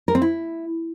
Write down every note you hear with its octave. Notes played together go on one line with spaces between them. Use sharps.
A#4
C4
E4